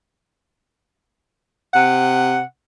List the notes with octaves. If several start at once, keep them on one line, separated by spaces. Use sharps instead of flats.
C3 F#5